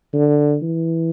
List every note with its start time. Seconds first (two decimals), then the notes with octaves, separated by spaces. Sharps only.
0.13 D3
0.62 E3